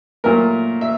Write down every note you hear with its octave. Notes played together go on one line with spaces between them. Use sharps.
A#2 F#3 A3 A#4
E5